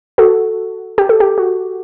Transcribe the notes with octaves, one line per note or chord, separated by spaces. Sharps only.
F#4 A4
G4
A4
G4
F#4